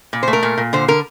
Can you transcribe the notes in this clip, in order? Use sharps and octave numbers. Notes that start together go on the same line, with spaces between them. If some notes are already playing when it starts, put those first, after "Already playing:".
A#2
C5
A3
A#4
A#2
A#2
D3 C5
D3 A#4